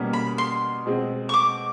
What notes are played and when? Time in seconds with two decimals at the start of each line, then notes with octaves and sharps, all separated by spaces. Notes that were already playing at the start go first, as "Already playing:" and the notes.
Already playing: B2 G3 A#3 C#4
0.13 B5
0.38 C6
0.86 B2 G#3 C4
1.29 C#6
1.34 D6